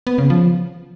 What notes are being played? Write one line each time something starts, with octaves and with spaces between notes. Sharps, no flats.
B3
C#3
F3